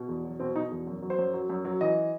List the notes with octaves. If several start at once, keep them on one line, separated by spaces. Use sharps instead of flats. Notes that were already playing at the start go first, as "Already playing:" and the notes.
Already playing: B2
E2
F#3
B2 C4
B2 D#4
E2
F#2
F#3
C5
F#2
F#3
F#2
F#3
E3 D#5